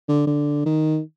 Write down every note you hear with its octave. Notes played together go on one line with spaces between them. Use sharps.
D3
D3
D#3